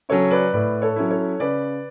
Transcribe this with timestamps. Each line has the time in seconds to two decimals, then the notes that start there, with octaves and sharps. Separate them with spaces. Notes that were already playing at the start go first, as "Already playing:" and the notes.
0.09 C#3 F#3 C#4 A4 C#5
0.31 B4 D5
0.53 A2 B4 D5
0.82 A4 C#5
0.96 F#3 C#4 E4
1.11 A4 C#5
1.40 C#3 B4 D5